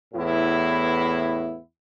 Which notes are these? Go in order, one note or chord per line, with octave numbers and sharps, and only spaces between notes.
E2 A2 B3 E4